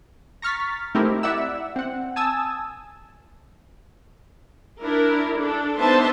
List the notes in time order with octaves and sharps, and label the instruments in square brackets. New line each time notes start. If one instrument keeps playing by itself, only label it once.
[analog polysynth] A#5 C#6 F6 A6 B6
A3 C4 D#4 E4 G4 A#4
E4 D5 E5 F#5 E6
C4 F#5
G#5 A5 D#6 E6 G#6
[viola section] D4 E4 A#4
D4 A4
B3 D4 D#4 C5 E5 A5